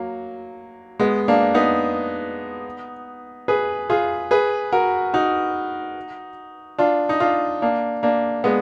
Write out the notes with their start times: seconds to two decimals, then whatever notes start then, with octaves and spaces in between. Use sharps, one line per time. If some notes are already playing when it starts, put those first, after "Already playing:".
Already playing: F#3 A#3
1.00 G#3 B3
1.28 A#3 D4
1.55 B3 D#4
3.48 G#4 B4
3.90 F4 G#4
4.31 G#4 B4
4.72 F#4 A#4
5.13 D#4 F#4
6.78 D4 F4
7.09 D#4
7.20 D4 F4
7.62 A#3 D4
8.03 A#3 D4
8.44 G#3 B3